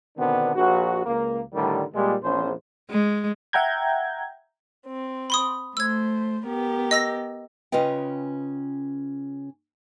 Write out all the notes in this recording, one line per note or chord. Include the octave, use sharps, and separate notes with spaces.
B2 D3 D#3 B3 C4 D4
A#1 F#4
C#2 A#3
A2 D3 D#3 G3
A#2 G3 G#3
A#1 E2 C#4 G#4 C5
G#3
E5 F#5 G5 A#5 G6 G#6
C4
B5 C6 D#6
A3 C5 E6 G#6
B3 G4 A#4
D#5 E6 A#6
C#3 C#4 F4 B4 D#5 G5